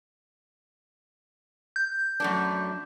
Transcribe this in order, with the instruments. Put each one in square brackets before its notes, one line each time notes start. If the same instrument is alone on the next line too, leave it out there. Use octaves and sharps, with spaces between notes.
[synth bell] G6
[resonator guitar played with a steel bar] F#2 A3 D4